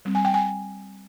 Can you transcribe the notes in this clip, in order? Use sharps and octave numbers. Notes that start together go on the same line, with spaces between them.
G3 C4
G#5
G5
G#5